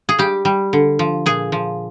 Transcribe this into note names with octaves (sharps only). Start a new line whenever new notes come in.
G#4
G3 G4
G3
D3
F3
A#2 G#4
F3